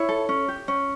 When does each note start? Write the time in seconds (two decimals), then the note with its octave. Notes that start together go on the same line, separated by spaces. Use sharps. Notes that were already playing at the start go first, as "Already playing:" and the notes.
Already playing: E4 C#5
0.09 A4
0.29 C#4
0.48 G4
0.68 C#4